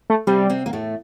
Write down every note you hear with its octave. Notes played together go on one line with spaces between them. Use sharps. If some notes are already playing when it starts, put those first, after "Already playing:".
A3
C3 G3 C4
C3 C4
A#3
A2 A3